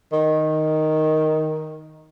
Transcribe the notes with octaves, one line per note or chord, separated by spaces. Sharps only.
D#3